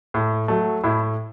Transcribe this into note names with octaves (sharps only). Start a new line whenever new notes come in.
A2
F#3 A3
A2 E4